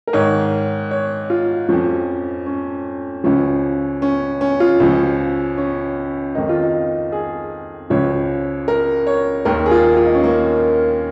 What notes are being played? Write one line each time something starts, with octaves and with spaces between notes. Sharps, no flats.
A#4
G#2 D#3 C#5
C#5
F4
F2 F3 C#4
C#4
C#2 C#3 F3 C#4
C#4
C#4
F4
C#2 C#3 F3 C#4
C#4
F2 D#3 D#4
F4
D#4
G#4
C#2 C#3 F3 C#5
A#4
C#5
D#2 D#3 A#4
G#4
F4
F4
D#4
C#4
A#3